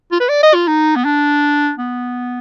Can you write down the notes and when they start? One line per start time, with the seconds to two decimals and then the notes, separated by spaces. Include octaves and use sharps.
0.12 F4
0.20 B4
0.30 D5
0.43 D#5
0.54 F4
0.68 D#4
0.96 B3
1.05 D4
1.79 B3